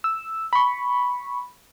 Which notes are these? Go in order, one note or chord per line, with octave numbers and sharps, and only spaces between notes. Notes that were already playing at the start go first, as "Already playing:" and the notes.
E6
B5 C#6